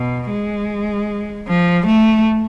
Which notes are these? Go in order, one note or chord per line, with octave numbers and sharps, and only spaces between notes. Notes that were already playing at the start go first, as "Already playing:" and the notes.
Already playing: B2
G#3
F3
A3